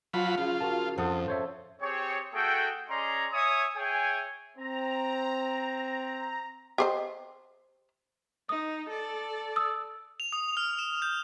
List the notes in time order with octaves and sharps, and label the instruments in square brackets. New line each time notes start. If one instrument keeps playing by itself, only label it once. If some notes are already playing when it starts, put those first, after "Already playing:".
[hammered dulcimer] F3 [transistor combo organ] F#3 F4 B5
[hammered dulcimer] C#3 [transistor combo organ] F4
[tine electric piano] F#4 A#4 A5
[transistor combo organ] F2 [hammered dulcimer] A4 [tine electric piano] C5 F#5 D#6
[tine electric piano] C5 C#5 E5
[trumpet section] C4 G4 G#4 C#5
A3 F#4 G#4 A4 G5
C#4 G#4 D5 D#5 A#5 C6
C#5 E5 G#5 D#6
G#4 C#5 E5 G5 G#5
[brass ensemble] C4 [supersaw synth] A#5
[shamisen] G4 C5 D#5
[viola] D#4 [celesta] D#6
[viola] A4 D5
[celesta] D#6 E6
[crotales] F7
D#6
F6
E7
G6